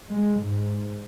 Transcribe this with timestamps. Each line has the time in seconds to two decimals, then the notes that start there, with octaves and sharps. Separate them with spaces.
0.11 G#3
0.44 G#2